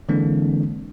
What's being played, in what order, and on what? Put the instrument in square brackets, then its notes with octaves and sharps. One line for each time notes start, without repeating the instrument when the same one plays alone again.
[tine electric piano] D3 E3 G#3 A#3 C4 D4